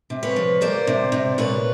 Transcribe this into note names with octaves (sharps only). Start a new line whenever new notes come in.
C3
B4 C#5
F3
A#3 C5 D5
C3
C3
A#2 B4 C#5